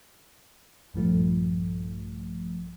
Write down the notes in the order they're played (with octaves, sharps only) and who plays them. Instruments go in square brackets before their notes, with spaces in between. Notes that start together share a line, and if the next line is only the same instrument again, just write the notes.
[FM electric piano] A#1 G2 F3 A3